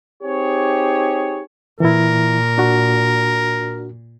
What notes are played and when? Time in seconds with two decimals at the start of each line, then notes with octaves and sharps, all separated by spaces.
0.23 C4 D#4 G4 G#4 C#5
1.80 A#2 E3 E4 A#4
2.58 D4 F#4